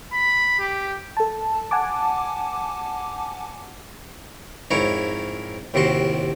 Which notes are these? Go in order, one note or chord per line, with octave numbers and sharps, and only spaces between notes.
B5
G4
A4 A5
F#5 G#5 A5 D6
F2 G#2 E4 A#4 C#5
D#2 A2 C3 F#4 C6